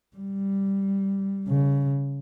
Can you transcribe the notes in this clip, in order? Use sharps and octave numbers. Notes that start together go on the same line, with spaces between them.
G3
C#3